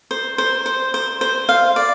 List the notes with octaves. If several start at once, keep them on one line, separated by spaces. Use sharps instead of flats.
C5
C5
C5
C5
C5
F5
D5